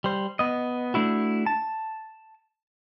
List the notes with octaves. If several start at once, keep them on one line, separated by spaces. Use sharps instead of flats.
G3 C5
B3 D#5
A3 D4 E4 F#4
A5